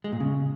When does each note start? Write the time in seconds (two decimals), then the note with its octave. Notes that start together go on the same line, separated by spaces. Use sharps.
0.04 G#3
0.12 A#2
0.20 C#3